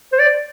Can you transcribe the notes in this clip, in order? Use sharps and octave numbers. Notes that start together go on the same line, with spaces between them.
C5
D5